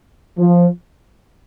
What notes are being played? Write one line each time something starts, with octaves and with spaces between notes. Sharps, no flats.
F3